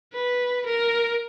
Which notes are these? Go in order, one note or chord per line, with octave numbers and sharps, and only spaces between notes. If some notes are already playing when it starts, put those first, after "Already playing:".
B4
A#4